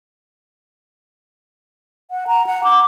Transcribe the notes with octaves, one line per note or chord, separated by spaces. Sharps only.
F#5
A#5
F#5
D6